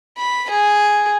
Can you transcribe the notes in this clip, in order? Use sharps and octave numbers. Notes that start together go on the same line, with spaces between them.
B5
G#4